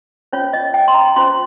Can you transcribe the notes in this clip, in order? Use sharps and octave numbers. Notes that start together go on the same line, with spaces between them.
C#4 F4 C5 C#5
D#5
G5
C6
A#5
C#4 F4 C5 C6